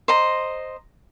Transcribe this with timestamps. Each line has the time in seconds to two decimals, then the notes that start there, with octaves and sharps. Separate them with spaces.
0.08 C5 D#5 A#5